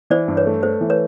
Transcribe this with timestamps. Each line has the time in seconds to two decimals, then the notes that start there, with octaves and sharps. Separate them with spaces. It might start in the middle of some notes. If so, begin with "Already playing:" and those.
0.10 E3 C5 D5
0.28 G2
0.37 B4 C#5
0.46 A3
0.63 A3 C5
0.81 E3
0.90 B4 C#5